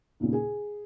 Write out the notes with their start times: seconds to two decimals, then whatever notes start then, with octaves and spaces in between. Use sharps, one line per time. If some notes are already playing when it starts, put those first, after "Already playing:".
0.20 D#2 A#2 C#3
0.33 G#4 G#5